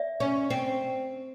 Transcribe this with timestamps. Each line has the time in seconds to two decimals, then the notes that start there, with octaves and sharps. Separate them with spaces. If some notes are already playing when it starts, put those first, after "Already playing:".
Already playing: D5 E5
0.20 C#4
0.50 C4